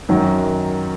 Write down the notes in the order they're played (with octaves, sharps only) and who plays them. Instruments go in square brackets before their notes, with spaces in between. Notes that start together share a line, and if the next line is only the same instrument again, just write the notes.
[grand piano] F#2 D#3 F#3